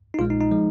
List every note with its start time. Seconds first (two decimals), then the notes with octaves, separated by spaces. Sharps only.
0.14 D#4
0.19 A#1 A#2 G#3 F4
0.30 D#4
0.41 D#4
0.51 F3 G#3